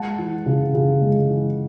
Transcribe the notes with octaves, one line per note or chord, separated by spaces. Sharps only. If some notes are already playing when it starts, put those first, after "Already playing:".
Already playing: G#3 F#5 A5
E3
C#3
C#3
G#3
E3